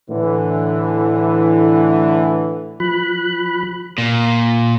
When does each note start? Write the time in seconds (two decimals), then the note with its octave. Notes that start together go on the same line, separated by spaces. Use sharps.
0.10 A2 D3 E3
2.80 F3 B5 F#6
3.98 A#2